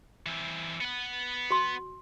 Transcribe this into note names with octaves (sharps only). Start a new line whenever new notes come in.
E3 C4
B3 F#5
F#4 C6